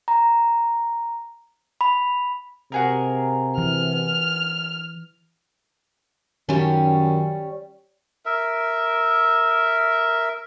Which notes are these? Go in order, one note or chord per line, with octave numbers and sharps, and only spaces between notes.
A#5
B5
C3 F#4 G#4 A#4
E3 F6
F#2 D#3 G3 C#4
A#4 E5